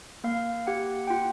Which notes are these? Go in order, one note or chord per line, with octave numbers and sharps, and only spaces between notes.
A#3 F5
G4 F#5
G5
F4 F#5